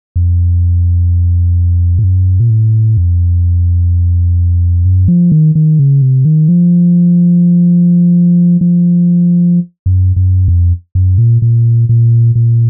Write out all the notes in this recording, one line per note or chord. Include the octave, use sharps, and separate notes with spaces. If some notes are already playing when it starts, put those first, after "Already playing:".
F2
A2
F#2
A#2
A2
F2
F#2
F3
D#3
D#3
C#3
C3
D#3
F3
F3
F#2
F#2
F2
F#2
A#2
A#2
A#2
A#2